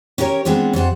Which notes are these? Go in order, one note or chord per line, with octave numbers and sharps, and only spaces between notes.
C#4 E4 G4 A#4 C#5
G#3 B3 C4 D4 F4
F2 G3 C5 F#5